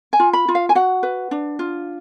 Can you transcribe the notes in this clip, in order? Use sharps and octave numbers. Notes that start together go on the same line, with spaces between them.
G#5
F4
B5
F4
F5
G#5
F#4 F#5
B4
D4
F4